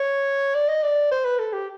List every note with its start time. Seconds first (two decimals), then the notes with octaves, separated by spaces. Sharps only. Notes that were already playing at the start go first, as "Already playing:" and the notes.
Already playing: C#5
0.55 D5
0.68 D#5
0.83 D5
1.11 C5
1.25 B4
1.39 A4
1.53 G4